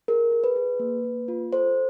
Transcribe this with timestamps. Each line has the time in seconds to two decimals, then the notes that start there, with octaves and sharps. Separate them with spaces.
0.08 G#4 A#4
0.32 G#4
0.44 B4
0.56 G#4
0.80 A#3
1.04 A#3
1.28 F4
1.52 A4 C5